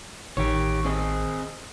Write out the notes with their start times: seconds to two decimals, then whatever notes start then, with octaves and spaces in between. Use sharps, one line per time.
0.37 A1 D#3 G4 C#5
0.85 C4 G#4 D#5